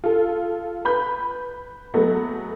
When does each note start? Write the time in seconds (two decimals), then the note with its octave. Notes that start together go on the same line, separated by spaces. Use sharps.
0.04 F4 A4
0.85 B4 B5 G6
1.94 F#3 G#3 A3 B3